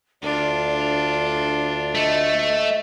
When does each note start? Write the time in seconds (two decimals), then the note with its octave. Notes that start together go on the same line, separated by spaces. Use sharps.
0.23 D2 D4 F4 D5
1.95 A3 D#5